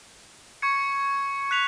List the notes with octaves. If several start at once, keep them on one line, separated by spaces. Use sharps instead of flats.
C#6 G#6 C#7
F#6 B6 F7